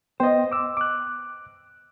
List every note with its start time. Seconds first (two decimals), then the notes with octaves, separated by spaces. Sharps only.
0.20 B3 C5 D#5 G5 C6
0.52 D6 E6
0.77 D6 F#6